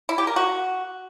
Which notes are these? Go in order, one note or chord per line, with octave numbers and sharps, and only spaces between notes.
E4
G4
A#4
F#4